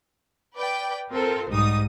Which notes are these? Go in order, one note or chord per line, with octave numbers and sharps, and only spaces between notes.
B4 D5 G5
C4 F4 A4 A#4 C5
B1 G#2 G3 D#4 D#6